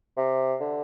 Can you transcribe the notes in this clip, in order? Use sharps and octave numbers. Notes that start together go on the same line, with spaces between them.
C3
D3